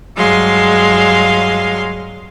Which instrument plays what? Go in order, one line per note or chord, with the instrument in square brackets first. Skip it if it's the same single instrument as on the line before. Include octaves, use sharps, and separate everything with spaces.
[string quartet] G2 F#3 G#3 F5 C6